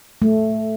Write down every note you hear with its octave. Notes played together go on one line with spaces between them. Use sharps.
A3